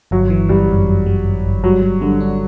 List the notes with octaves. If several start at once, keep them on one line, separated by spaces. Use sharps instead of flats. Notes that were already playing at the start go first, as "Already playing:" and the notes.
G1 F#3
E3
G1 G3
F#2
F#2
G3
G1
G1
F#3 G3
G3
D3 G3
D4